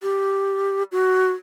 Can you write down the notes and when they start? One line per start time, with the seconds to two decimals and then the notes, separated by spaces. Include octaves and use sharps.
0.02 G4
0.92 F#4